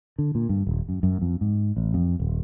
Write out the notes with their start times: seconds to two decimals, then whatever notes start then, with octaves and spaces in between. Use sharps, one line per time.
0.18 D3
0.35 A#2
0.49 G2
0.67 D#1
0.89 F#2
1.03 F#2
1.22 F2
1.41 G#2
1.77 A1
1.94 F2
2.20 D#1